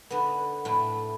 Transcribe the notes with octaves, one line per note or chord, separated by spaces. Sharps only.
D3 B3
A2 E4